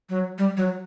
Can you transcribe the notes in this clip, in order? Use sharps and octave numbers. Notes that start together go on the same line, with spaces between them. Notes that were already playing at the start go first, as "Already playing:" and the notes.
F#3
G3
F#3